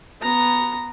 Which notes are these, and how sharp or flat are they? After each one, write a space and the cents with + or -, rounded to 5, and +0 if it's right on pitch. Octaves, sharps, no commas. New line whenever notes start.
B3 +0 A#5 +0